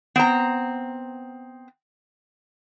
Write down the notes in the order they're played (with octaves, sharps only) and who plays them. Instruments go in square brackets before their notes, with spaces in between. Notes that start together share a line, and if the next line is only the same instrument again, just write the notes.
[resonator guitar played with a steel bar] B3 C4 A#5